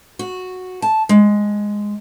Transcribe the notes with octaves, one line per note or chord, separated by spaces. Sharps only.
F#4
A5
G#3